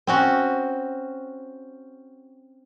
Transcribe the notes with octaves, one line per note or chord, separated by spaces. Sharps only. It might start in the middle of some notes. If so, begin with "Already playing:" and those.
C4 C#4 F#4